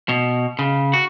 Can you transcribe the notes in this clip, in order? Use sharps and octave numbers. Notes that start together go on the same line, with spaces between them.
B2
C#3
F#4